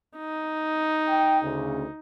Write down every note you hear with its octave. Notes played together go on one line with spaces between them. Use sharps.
D#4
G5
D2 C#3